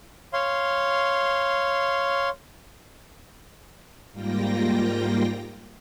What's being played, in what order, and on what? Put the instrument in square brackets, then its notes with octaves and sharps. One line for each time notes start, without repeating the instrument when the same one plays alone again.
[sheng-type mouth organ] C#5 F5 C6
[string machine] G#2 G3 A#3 F4 G5 A#6